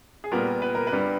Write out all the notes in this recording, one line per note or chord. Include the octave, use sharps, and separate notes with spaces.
G#4
A#2 G3 B3 A#4
B4
A#4
B4
G2 G3 B3